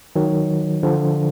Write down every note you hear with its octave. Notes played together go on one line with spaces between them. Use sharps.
D#3 F#3
D3 F3